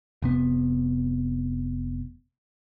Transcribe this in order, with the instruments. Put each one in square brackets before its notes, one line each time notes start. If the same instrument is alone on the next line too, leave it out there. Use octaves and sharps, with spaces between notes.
[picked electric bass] F1 C3 B3